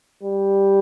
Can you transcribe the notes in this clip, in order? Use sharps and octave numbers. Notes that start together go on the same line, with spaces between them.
G3